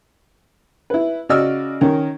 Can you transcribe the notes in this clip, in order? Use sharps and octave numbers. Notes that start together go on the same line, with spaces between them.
E4 B4
C#3 F#4 D5 D#5 E6 F6
D#3 C#4 A#4